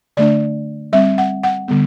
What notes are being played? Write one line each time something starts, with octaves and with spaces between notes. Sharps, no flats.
D3 A3 D4 D5
G3 C4 E5
F#5
F#5
D3 G3 B3